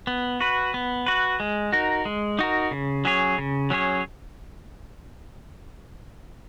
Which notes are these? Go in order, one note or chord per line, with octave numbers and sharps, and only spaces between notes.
B3
F#4 B4
B3
F#4 B4
G#3
D#4 F#4 A#4
G#3
D#4 F#4 A#4
C#3
F#3 C#4 G#4 C#5
C#3
F#3 C#4 G#4 C#5